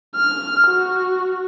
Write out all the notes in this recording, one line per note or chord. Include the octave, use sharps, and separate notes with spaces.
F6
F#4